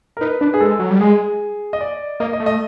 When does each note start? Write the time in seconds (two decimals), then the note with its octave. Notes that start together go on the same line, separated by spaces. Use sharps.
0.17 A#4
0.21 D#4 B4
0.41 D4 B4
0.54 G#4
0.60 G#3 A4
0.79 F#3
0.91 G3
1.00 G#3 G#4
1.73 D#5
1.81 D5
2.20 A#3 D#5
2.33 D#5
2.40 A3
2.46 D#5